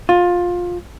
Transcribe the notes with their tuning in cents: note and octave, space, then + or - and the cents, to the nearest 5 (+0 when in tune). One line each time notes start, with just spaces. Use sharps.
F4 +20